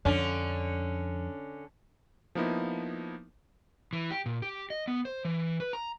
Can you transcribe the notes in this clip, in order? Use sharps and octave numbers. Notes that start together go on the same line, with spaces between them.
F2 D3 C#4
F3 A#3 B3 D#4 E4
E3
G4
A#2
G4
D#5
B3
C5
E3
B4
A#5